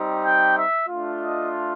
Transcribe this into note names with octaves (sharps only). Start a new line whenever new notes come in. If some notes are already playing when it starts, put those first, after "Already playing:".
Already playing: G3 C4 D#4 G4
G5
E5
A3 D4 F4
D#5